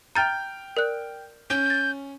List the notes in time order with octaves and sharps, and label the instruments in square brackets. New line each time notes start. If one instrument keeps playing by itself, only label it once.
[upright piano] G5 F6 G6 [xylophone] A#5 A6
[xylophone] A#4 D5 F#6
[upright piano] C#4 [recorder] G6
[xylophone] A6